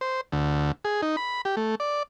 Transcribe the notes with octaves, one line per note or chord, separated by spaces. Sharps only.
C5
D2
G#4
D#4
B5
G4
A3
D5